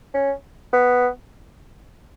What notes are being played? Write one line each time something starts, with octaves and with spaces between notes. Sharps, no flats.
C#4
B3